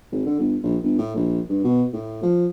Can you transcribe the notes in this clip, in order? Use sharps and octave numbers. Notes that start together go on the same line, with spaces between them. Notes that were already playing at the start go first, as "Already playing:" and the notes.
G#1
D3
G1
A#1
G1
A2
A#1
G2
B2
A2
F3